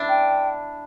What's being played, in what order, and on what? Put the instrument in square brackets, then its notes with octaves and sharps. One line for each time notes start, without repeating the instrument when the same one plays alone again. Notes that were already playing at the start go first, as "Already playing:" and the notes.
Already playing: [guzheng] D4 E4
[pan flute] G5